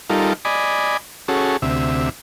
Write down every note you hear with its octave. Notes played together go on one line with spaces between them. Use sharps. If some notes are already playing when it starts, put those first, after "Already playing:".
G3 D#4 F4 A4 A#4
D5 D#5 G#5 B5
C#4 F#4 G#4 A4
D2 C3 E5